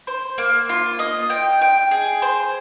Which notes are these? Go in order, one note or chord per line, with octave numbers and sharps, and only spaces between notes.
C5
A#3
F4
D#5
G5
G5
G#4
C5